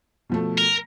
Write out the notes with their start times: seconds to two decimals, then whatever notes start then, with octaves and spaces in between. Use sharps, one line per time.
0.29 B2 F3 A3
0.58 A#4